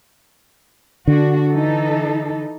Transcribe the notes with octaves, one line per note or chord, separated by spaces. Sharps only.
D3 D4 F#4
E3 D#4 A4